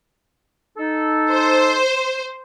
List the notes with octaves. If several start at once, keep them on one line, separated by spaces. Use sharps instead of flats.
D#4 A4
C5